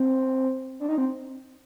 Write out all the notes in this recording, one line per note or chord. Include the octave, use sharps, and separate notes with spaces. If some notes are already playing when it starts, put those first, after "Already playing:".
Already playing: C4
D4
D#4
C4